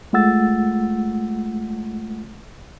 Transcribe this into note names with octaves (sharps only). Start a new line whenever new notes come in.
G#3 A3 F4 F#5 E6 A6